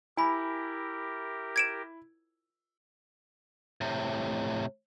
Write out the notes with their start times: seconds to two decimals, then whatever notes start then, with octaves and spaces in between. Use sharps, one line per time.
0.17 E4 G4 A#4 G#5 B5
1.56 G#6 D7 E7
3.81 A2 C3